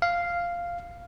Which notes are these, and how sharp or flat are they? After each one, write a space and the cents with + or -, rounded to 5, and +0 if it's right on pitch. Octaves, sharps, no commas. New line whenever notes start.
F5 -5